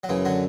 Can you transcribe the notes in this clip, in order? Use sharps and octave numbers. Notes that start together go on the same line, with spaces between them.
F#3
F#2 C#3 E3
D3 F#3